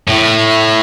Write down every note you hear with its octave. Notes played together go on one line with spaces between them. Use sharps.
A2